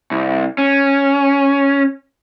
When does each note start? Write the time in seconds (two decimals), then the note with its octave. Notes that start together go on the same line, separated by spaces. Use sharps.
0.11 C2
0.58 C#4